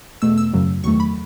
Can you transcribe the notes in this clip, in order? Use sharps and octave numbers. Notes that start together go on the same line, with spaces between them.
E2 B2 A3 E6
E6
F#2 C#3 F#3
E2 D#3 F#3 A3 C#6
B5